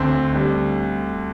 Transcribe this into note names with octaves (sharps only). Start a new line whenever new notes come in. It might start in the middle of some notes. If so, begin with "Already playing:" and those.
Already playing: D2 C4
D3 G3